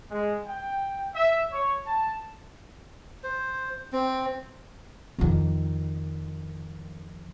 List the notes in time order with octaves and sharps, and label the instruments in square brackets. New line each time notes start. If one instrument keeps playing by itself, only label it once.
[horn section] G#3
G5
E5
C#5
A5
[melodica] C5
C4
[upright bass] F2 D#3